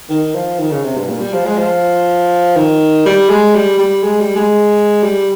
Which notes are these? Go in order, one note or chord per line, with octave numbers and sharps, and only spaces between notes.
D#3
F3
D#3
C#3
C3
G2
A#2
G3
F3
G#3
F3
D#3
G3
G#3
G3
G3
G#3
G3
G#3
G3